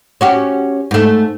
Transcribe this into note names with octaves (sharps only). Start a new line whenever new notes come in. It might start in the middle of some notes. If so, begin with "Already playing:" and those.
C#4 F#4 G4
G#2 A3